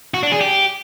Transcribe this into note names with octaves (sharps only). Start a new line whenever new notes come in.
F#4
D4
G#4
G4